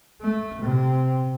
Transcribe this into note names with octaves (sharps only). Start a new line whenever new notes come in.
A3
C3